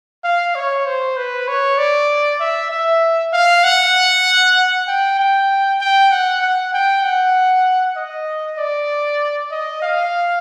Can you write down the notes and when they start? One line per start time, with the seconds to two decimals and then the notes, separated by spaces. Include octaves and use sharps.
0.24 F5
0.55 C#5
0.86 C5
1.17 B4
1.48 C#5
1.78 D5
2.40 E5
2.71 E5
3.33 F5
3.64 F#5
4.88 G5
5.19 G5
5.81 G5
6.11 F#5
6.42 F#5
6.73 G5
7.04 F#5
7.97 D#5
8.58 D5
9.51 D#5
9.82 F5